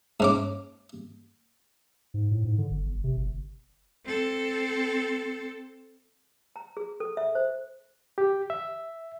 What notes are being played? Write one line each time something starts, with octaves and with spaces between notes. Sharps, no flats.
G#2 C#4 D6
G#2
A2
G#2
D3
G1
G1
C3
G1
C4 A4
A#5
G#4
A4
E5
C5
G4
E5